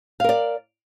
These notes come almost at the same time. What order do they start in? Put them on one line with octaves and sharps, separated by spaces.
F5 A#4 D5